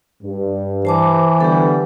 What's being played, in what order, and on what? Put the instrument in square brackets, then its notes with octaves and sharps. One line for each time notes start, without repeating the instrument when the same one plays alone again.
[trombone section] G2
[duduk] E3 [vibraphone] C5 A5 D6
[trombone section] D3 G3 B3 [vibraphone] G4 A4